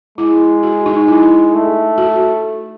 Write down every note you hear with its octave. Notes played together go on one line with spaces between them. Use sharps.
G#3 E4
F#4
D#4
E4
A3
F#4